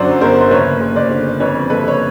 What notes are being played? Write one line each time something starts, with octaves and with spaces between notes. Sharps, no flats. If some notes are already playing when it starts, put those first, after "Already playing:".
Already playing: G1 F#2 D3 F#3 C5 D5
G1 A#4 C5
C5
F#1 B4 C#5
F#1
C5 D5
D3
F2 B4 C#5
F#1 A4 B4
C#5